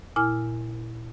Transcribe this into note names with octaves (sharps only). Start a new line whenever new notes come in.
A#2 E4 G#5 F6